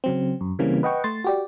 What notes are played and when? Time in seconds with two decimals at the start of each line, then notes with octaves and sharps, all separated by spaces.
0.04 C#3 F#3 C4
0.41 F#2
0.59 C#3 E3 G3 A#3 C4 C#4
0.83 B4 D#5 F#5 G5 C#6
1.04 A3 C6 A6
1.24 F#4 G4 D5